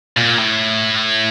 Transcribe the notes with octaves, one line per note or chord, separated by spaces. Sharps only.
A#2
A2